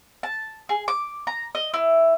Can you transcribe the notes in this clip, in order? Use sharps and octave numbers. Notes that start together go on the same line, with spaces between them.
A5
G#4
D6
A#5
D#5
E4